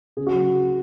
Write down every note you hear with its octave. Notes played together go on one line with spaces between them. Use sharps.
C#3 G#4
F#4
F#3